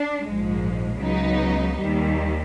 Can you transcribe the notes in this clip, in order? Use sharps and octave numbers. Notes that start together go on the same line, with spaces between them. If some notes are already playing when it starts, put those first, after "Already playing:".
Already playing: D4
A#1 G#2 F3 G#3
C#2 C#3 F#3 B3 D#4
D#2 D#3 G3